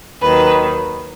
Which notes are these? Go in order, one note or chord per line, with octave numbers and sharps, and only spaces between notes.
D#2 D#3 F#3 B4